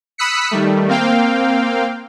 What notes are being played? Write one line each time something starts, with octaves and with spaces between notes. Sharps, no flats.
B5 D#6 E6 F#6 B6 C#7
D#3 G3 A3
A#3 C4 F5 G5